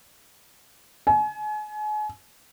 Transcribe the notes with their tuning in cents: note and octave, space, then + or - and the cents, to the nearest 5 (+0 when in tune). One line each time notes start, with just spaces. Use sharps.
G#5 +35